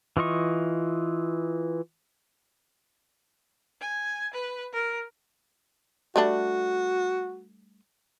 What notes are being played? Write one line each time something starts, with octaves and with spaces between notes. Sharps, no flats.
E3 F4 D#5 C#6
G#5
B4
A#4
G3 A3 D4 F#4